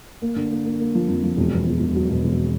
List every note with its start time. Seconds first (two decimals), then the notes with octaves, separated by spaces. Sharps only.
0.22 A#3
0.36 D3
0.51 A#3
0.66 A#3
0.79 A#3
0.95 F3
1.08 F2
1.23 F3
1.37 E1
1.52 E2
1.67 E1
1.80 E1
1.95 F#3
2.10 B2
2.24 E1